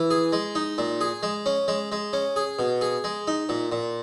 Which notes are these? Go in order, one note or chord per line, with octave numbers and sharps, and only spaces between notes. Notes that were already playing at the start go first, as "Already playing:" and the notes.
Already playing: E3
G#4
G#3
D#4
A#2
G#4
G#3
C#4
G#3
G#3
C#4
G#4
B2
G#4
G#3
D#4
A#2
A#2